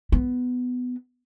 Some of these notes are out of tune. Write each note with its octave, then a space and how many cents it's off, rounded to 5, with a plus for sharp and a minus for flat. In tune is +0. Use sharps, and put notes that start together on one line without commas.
B3 +10